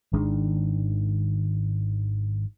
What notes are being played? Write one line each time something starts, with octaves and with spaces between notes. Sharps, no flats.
G#1 D#3 G#3 D4